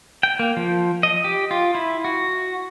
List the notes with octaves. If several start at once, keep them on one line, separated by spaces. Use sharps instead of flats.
G5
A#3
F3
D#5
G4
F4
E4
F#4